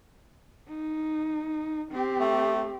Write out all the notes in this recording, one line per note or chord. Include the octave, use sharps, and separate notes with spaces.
D#4
C4 G4
A3